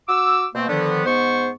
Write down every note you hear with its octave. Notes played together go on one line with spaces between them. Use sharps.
F#4 D6 E6
B2 A3 A#3 C4
D3 D#3 F3 B3
G#2 B3 C5 C#6